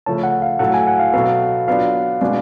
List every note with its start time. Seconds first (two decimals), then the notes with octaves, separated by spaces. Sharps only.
0.06 C#3 F3 A3 C#4 A5
0.24 F#5
0.42 F5
0.59 A2 F#3 A3 F#5
0.74 G#5
0.87 F#5
1.00 F5
1.13 B2 F#3 B3 F#4 A4 F5
1.68 F#3 B3 D4 F4 F5
2.21 B2 G#3 B3 D4 G#4